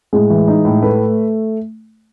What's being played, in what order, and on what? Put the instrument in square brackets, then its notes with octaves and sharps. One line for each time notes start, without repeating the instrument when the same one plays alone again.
[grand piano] A2 [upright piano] G#3
[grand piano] E3
D#4
A2
[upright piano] A3 [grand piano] B4